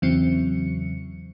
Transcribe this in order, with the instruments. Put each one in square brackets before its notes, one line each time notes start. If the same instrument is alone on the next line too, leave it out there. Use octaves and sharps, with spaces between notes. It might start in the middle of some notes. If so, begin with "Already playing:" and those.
[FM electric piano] E2 C#3 E3 F#3 C4 C#7